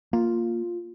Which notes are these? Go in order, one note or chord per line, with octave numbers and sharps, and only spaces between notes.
A#3 F4